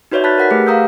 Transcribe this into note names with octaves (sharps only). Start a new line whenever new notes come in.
D#4 F#4 B4 C#5 D5 E5
A5 B5 F#6 A6 B6
A#4 F#5 B6
A3 G4 G#4 B4
F5 F#5 A#5 D#6 E6 G6